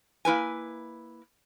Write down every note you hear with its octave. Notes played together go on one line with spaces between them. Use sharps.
A#3 E4 B4 G#5